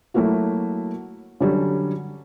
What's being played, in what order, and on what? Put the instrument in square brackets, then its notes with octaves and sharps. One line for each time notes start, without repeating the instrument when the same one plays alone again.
[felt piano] F#3 A3 A#3 E4 F#4
D3 F#3 G3 C#4